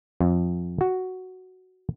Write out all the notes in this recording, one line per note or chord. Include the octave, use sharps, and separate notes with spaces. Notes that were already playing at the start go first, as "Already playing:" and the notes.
F2
F#4